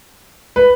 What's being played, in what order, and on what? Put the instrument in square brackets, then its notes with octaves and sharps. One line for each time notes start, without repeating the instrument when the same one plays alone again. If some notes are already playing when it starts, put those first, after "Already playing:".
[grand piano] B4